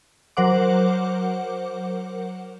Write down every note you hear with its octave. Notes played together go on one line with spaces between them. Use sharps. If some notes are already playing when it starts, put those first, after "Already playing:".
F#3 A#4 C5 F#5 D6